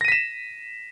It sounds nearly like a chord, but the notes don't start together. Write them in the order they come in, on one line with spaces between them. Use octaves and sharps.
A#6 D#7 B6 E7